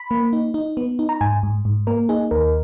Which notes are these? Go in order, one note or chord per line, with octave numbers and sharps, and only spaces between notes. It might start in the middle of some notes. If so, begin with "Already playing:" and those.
Already playing: B5
A#3
D#4
D#4
B3
D#4
A#5
G#2 G#5
G#2
G#2
A#3 A#4
D#4 G#4
D#2 A#4